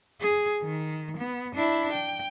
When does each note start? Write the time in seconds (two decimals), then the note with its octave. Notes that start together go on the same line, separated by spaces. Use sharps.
0.21 G#4
0.63 D#3
1.17 B3
1.55 D4 E4
1.93 G5